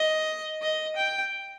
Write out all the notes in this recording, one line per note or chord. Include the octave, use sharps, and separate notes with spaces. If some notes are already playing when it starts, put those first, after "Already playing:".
Already playing: D#5
D#5
G5